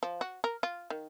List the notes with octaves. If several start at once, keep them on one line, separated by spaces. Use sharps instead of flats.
F3
F#4
A#4
F4
D#3